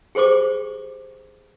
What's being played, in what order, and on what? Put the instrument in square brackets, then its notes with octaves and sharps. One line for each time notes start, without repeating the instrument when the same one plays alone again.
[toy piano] G4 G#4 C5 C#6 D6